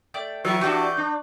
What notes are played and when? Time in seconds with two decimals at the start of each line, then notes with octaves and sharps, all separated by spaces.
0.14 A3 D5 G5
0.44 E3 F3 C#6
0.61 D4 F#4 G4 D5 C#6 G6
0.97 D4